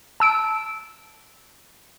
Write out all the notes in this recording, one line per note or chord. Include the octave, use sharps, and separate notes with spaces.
A5 E6 D7